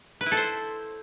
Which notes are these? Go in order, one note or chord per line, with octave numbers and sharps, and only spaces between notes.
B4
E4
A4
C5